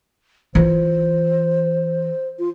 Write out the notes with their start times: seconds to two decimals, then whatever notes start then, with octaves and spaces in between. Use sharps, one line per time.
0.55 E3 F4 C5
2.39 F4